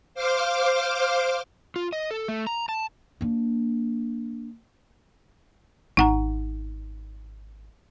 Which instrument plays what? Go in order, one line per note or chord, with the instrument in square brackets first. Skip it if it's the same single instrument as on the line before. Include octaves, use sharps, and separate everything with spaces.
[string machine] C5 F5 D6 F6
[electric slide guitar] F4
D#5
A4
A3
A#5
A5
[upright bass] A#3 D4
[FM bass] G#1 [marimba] D#4 F#5 A#5